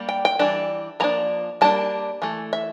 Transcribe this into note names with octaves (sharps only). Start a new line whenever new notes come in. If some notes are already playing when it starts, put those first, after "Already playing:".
Already playing: G3 A#3 D4
G5
G5
E3 G3 D4
F3 A#3 D4 A#5
G3 A#3 D4 A5
E3 A3
E5